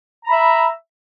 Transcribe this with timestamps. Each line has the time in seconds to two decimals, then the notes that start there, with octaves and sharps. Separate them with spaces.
0.24 A#5
0.28 B5
0.31 E5